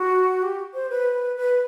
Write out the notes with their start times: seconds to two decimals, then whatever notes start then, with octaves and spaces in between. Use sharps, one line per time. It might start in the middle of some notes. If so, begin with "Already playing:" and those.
Already playing: F#4
0.42 G4
0.74 C5
0.90 B4
1.36 B4